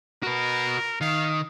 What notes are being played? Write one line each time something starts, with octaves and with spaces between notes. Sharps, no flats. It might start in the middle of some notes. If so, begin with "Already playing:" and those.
F#4 A#4 B4
D#3 F5